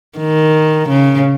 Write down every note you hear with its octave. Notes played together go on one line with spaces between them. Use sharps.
D#3
C#3